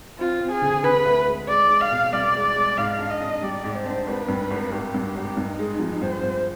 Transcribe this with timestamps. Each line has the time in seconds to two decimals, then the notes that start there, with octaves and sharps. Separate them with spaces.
0.18 C4 F4
0.40 C4
0.51 G#4
0.62 D3
0.83 D3 B4
1.05 D2
1.27 G#3
1.48 G#3 D5
1.70 G#3
1.80 F5
1.91 B2
2.12 C2 D5
2.35 G#3
2.56 G#3
2.77 G#2 F5
2.99 D4
3.10 D#5
3.21 D4
3.42 G3 D5
3.64 G#2
3.75 C5
3.86 D4
4.07 G#1 B4
4.28 G2
4.50 G#1
4.72 G#1 G4
4.94 G2
5.04 G4
5.15 G#1
5.37 G2 D#4
5.59 G#3
5.80 F3
6.01 G2 C5
6.23 G2